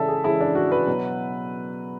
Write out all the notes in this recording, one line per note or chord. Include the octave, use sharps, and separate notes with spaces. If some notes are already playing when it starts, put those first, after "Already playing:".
Already playing: C#3 E3 G#3 A4 D5 E5
G#4
C#3 E3 G#3 E4
D4
F#4
B4
B2 F#3